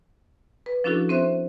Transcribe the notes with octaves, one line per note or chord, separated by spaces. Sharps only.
B4
F3 C#4 D4 E4 F#4 A4
C4 C5 E5 F#6